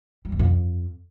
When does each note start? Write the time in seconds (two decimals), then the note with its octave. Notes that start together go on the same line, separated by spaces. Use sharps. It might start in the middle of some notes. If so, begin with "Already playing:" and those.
0.25 G3
0.32 E2
0.39 F2